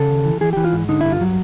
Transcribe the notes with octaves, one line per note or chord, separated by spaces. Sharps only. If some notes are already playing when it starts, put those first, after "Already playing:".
Already playing: C#3 A4
D#2
E3
E3 G#4
E3 G4
F4
G#2
D3 D#4
G2 E4
F4
F#3